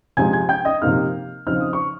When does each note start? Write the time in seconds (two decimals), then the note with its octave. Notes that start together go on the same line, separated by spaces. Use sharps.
0.17 C3 F3 G#3 G#5 G#6
0.33 G#5 G#6
0.49 G5 G6
0.65 D#5 D#6
0.82 C3 F3 A#3 D#4 F5 F6
1.47 C#3 F3 C4 D#4 F6
1.60 D#6
1.73 C#6